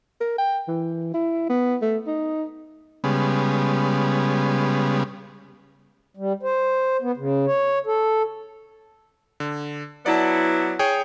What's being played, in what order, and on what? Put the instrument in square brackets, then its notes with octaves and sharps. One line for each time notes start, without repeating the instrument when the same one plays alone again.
[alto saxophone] A#4
G5
E3
E4
B3
A3
D#4
[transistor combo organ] C#3 G3 G#3 B3
[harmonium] G3
C5
B3
C#3
C#5
A4
[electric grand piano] D3
[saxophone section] F#3 B3 E4 [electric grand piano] D5 A5
[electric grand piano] G#4 C#5 G5